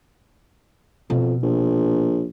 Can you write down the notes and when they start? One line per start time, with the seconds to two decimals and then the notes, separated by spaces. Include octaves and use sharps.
1.10 F2 B2
1.43 A#1